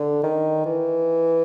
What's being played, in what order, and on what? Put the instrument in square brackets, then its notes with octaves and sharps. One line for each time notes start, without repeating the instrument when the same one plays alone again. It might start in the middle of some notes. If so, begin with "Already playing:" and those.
Already playing: [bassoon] D3
D#3
E3